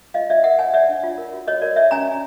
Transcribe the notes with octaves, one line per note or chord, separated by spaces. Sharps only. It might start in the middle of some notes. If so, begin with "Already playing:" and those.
F4 D#5 F5
F4 D5 E5
A#4 E5 F#5
C#5 F#5 G#5
C#5 D5 E5
D4
F4
A#4
F#4
F#4 C#5 D#5
A#4 D5
C#5 D5 E5
C#4 G#5 A#5
C#4